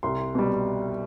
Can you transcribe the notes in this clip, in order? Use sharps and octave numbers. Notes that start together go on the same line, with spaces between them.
C2 C6
B2 G3